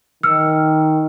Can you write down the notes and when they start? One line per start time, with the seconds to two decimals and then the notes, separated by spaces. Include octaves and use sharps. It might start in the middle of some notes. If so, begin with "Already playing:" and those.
0.23 D#3 E6 F6 C#7